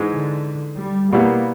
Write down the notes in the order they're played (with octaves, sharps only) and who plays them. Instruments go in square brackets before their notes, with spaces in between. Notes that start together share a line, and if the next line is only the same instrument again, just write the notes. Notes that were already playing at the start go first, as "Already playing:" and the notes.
Already playing: [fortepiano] G#2 E3 G#3
[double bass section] D3
G3
[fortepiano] B2 G3 B3 E4 [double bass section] A#3